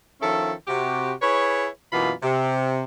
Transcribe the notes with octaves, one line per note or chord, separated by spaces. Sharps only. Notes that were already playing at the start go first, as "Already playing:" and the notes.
D#3 F3 C#4 E4 A4
C3 F#4 G4
E4 G#4 B4 C#5
F#2 B2 E3 A#3 F4 B5
C3